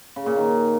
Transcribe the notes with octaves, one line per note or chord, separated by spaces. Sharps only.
C#3
A#2
D#3